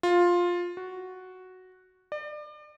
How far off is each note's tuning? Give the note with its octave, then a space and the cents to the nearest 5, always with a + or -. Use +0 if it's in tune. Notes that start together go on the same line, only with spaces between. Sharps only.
F4 +10
F#4 +0
D5 +35